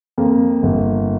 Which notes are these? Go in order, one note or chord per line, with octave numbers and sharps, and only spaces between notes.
F2 A#3
G1